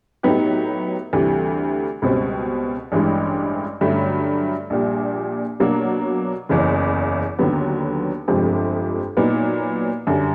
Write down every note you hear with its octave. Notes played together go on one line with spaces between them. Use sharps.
A2 F#3 B3 D#4 G4
D2 C3 E3 G3
C#2 B2 G3 C4
A1 G2 E3 G#3
G2 D3 F#3 A3 C#4
A#1 A#2 G3
B2 F#3 A#3 D4 F#4
F#1 E2 C#3 E3
D#2 D3 F#3 B3
G1 F2 C3 F3 G#3
A#2 F#3 B3 D#4
F#2 D3 G3